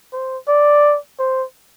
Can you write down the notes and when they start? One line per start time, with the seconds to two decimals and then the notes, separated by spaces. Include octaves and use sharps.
0.13 C5
0.48 D5
1.19 C5